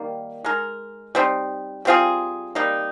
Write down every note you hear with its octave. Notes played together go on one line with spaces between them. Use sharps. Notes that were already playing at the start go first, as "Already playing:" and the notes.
Already playing: D#3 G3 A#3
G#3 D#4 A#4
G3 C4 D#4
G3 C4 F4 G#4
C3 G3 A#3 D#4